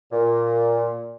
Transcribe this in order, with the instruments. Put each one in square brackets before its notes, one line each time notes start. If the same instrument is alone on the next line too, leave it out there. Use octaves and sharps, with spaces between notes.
[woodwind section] A#2